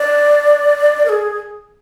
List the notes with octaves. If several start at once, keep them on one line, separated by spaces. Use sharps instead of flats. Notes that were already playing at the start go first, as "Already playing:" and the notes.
Already playing: D5
A#4
G#4